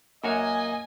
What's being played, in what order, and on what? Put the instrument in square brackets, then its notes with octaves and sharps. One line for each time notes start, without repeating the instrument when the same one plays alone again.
[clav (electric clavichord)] F#2 F#4 C#5 [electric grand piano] A#3 [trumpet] D#5 [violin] G#5